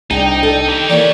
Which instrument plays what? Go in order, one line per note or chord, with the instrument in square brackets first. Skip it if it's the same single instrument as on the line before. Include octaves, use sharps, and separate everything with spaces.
[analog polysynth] C2 D4 G5 [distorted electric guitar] D#4 [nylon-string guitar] G#4
[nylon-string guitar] A4
[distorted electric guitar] D#4 G4 [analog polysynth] G5
[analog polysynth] E3 A#3 [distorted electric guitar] G4 C#5 [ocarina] D5